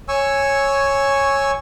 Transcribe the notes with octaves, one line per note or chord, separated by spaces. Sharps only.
C#5 G#5 C#6 E6